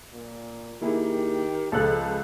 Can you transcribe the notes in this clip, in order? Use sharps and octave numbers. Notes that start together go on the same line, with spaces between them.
A#2
D#3 A#3 E4 G4 G#4
C#2 F3 A4 A5 F#6